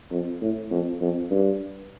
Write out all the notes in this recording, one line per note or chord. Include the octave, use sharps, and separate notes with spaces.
F2
A2
F2
F2
G2